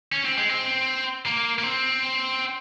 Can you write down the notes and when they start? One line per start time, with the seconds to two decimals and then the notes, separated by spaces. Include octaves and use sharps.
0.12 C#4
0.25 C4
0.38 G#3
0.49 C4
1.26 A#3
1.59 A#3
1.63 C4